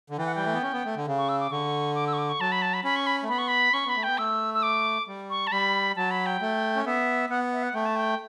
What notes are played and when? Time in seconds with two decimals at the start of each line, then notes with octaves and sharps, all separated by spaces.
0.10 D3
0.18 E3 G5
0.26 F#5
0.35 G3 G5
0.46 A3
0.54 B3
0.62 C#4
0.73 B3
0.85 A3
0.96 D3
1.07 C#3
1.18 C#6
1.29 E6
1.40 D6
1.52 D3 C#6
1.95 D6
2.07 E6
2.13 C#6
2.18 D6
2.29 C#6
2.41 F#3 A5
2.52 B5
2.62 A5
2.74 B5
2.84 C#4 B5
2.96 C#6
3.06 B5
3.23 A3
3.29 B3 B5
3.38 C#6
3.48 B5
3.73 C#4 C#6
3.85 B3 B5
3.96 A3
4.03 B3 G5
4.18 A3 E6
4.54 E6
4.63 D6
5.08 G3
5.30 C#6
5.47 A5
5.52 G3 B5
5.96 F#3 A5
6.11 B5
6.26 G5
6.42 A3
6.76 C#4
6.86 B3 E5
7.30 B3 F#5
7.52 E5
7.63 F#5
7.75 A3 G5
7.85 A5
7.96 G5